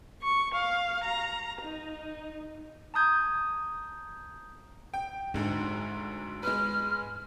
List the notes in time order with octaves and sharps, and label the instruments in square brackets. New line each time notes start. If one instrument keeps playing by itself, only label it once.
[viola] C#6
F5
A#5
D#4
[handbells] A5 A#5 D#6 G6 G#6
[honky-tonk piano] G5
[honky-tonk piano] F#1 D2 D3 [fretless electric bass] G#2
[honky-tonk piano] G#3 B4 [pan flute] F6